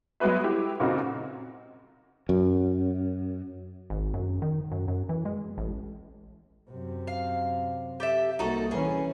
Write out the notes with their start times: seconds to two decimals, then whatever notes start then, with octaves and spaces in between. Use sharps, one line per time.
0.20 F#3 G#3 B3 F#4 B4 E5
0.44 E4 G4
0.80 A#2 C#3 C4 D#4 F#4 A#4
2.29 F#2
3.90 G#1
4.14 F#2
4.42 D#3
4.72 F#2
4.88 F#2
5.09 E3
5.25 G#3
5.58 A1
6.70 F#2 C3
7.07 F5
8.00 G4 A4 E5
8.39 C2 A#3 D#4 F#4 A4
8.71 E3 C#4 G#4